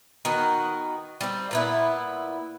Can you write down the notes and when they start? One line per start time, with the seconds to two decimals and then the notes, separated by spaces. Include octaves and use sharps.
0.25 D#3 B3 F#4
1.21 G3 C4
1.51 A#2 B3 E4